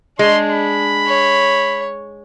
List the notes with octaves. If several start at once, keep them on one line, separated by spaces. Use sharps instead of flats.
G#3 D4 C6
B5
C#5